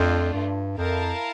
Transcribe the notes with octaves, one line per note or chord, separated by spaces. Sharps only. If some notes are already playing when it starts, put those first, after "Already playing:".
Already playing: F2 A3 D4 F4
G2
F2 E4 A#4 F5 A5